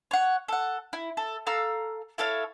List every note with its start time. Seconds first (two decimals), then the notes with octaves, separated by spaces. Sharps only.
0.11 C#5 F#5
0.48 A4 F#5
0.93 E4
1.17 A4
1.47 A4 F5 A#5 E6
2.18 E4 A4 C#5 F5